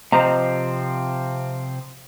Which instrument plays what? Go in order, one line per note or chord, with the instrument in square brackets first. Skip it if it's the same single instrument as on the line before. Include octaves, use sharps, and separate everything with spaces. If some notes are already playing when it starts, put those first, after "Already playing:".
[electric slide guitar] C3 F3 C4 [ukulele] C5 D#5 A#5